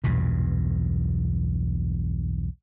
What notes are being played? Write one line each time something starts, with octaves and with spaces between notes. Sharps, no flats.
B1 E2 G2 A#2